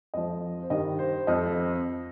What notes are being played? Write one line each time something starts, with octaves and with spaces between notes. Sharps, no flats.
F2 F3 D#5
C5
G2 D#3 G3 D#5
C5
F2 F3 D#5